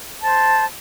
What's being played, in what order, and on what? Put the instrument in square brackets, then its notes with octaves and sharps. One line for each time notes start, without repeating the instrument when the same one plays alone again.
[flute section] C5 A5